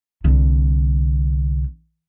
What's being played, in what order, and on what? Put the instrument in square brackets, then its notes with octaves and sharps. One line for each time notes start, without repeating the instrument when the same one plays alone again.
[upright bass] C2 D3